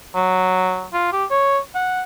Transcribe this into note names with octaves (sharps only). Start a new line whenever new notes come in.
F#3
F4
G4
C#5
F#5